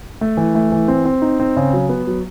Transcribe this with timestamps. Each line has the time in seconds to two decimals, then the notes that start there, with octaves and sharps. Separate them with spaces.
0.21 A3
0.37 E3
0.55 A3
0.72 E3
0.88 C4
1.05 C4
1.22 D#4
1.40 C4
1.57 C#3
1.73 F#3
1.89 B3
2.07 F#3